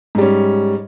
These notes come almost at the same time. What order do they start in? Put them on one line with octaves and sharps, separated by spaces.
G#2 G3 C#4